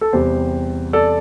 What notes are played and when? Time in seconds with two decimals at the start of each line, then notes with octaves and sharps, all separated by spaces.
0.01 A4
0.13 E2 C3 G3 G4 C5
0.93 A4 D5